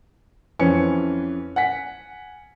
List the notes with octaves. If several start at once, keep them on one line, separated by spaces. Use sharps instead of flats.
F2 E3 C#4 B4 C#7
F#5 G#5 B6